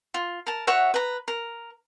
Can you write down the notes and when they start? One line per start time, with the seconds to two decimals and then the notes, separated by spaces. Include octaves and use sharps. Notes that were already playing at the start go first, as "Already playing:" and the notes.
0.14 F4
0.46 A#4 A5
0.67 F#4 C#5 E5 F#5
0.94 B4 A#5
1.28 A#4